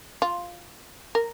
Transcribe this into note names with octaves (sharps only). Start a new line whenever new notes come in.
F4
A#4